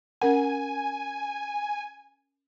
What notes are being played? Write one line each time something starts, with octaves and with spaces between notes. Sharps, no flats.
C#4 A#4 F#5 G#5